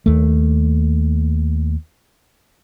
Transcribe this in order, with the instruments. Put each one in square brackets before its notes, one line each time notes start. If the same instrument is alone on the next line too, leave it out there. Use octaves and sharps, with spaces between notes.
[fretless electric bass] D#2 A3